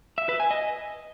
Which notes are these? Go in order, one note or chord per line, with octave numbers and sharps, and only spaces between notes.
E5
B4
G#5
D#5